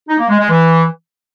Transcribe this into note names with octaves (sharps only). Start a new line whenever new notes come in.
D#4
A#3
G#3
G#3
E3